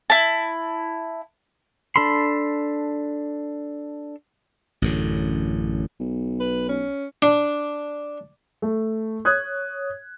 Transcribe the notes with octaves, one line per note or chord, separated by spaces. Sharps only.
E4 A5
D4 A4 B5 C6
A1 F#2 D3
B1
B4
C#4
D4
A3
C#5 D#6 F#6 G#6